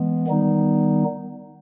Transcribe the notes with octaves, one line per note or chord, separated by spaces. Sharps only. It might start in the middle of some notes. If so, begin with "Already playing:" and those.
Already playing: E3 G#3 B3
D#3 G3 B3 D#4